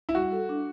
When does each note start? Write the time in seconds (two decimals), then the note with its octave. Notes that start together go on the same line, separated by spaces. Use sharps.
0.09 E4
0.15 G3 F#4
0.32 A4
0.49 D4